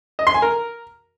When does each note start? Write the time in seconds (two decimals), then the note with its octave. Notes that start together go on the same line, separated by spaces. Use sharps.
0.19 D#5
0.27 C6
0.35 G#5
0.42 A#4